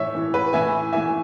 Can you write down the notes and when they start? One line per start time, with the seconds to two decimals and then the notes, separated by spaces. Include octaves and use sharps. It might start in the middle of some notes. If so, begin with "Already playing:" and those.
Already playing: A2 E3 C#5 E5
0.15 A2 E3
0.34 B4
0.53 A2 E3 E5 G#5
0.93 A2 E3 E5 G#5